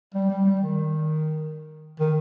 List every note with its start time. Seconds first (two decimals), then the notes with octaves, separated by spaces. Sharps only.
0.14 G3
0.30 G3
0.45 G3
0.61 D#3
2.00 D#3